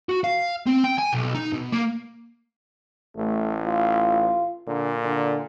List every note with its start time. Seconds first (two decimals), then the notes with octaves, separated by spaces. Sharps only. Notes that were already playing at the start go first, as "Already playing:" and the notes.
0.09 F#4
0.24 F5
0.66 C4
0.84 G5
0.98 G#5
1.13 B1
1.35 D#4
1.53 B2
1.73 A#3
3.17 A1 A3
3.66 F4
4.67 A#2 D3
5.04 D3